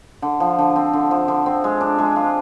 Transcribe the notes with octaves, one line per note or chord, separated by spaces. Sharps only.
D3
F3
D3
C4
D3
F3
D3
C4
G#3
D4
G#3
F4